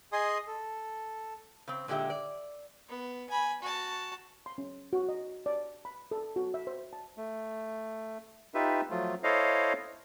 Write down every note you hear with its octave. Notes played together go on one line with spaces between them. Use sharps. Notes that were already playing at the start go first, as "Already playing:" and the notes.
G#4 D#5 G#5 C6 D#6
A4
C#3 C4
A#2 D3 G#3 G4 E5
D5
B3
G#5 B5
F#4 A5
C6
C#4
F#4
D#5
D5
B5
A4
F#4
E5
C5
A5
A3
D#4 F4 G4 B4 E5
F3 F#3 A3 F4
E4 A4 C5 C#5 D#5 F5